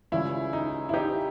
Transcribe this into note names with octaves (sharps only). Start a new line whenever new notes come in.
C#2 C#3 G3 E4
D#4
E4
D#4 G4